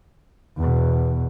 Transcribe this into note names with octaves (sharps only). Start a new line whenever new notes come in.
E2 B2